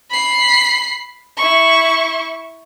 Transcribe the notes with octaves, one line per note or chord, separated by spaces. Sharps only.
B5 C7
E4 C#6